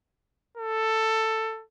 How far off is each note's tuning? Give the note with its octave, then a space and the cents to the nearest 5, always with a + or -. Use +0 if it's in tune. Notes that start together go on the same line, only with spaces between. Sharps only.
A4 +10